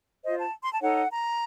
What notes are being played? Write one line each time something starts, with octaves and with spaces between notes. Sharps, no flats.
F4 C5 D#5
A5
C6
A5
D#4 A4 C#5 F#5
A#5